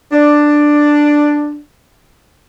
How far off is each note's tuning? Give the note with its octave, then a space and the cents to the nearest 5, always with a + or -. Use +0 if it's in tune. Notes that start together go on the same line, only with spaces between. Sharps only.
D4 +5